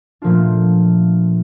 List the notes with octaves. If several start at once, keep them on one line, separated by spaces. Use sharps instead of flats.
A#2 F3 A3 D4 F4